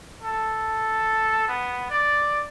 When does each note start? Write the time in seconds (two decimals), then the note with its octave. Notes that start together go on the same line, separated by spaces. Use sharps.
0.22 A4
1.48 B3
1.90 D5